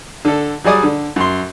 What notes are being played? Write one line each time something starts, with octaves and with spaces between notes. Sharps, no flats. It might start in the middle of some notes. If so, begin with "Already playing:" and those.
D3 A4
F#3 G3 G#4 D5 D#6
D3
F#2 C6